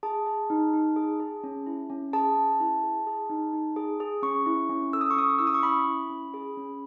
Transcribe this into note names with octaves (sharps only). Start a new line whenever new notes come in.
G#4 A5
G#4
D#4
D#4
G#4
G#4
C#4
E4
C#4
G#4 A5
C#4
E4
G#4
G#4
D#4
D#4
G#4
G#4
C#4 C#6
E4
C#4
A4 E6
D#6
C#6
C#4 D#6
E4 E6
D#6
C#6
C#4 B5
E4
C#4
G#4
C#4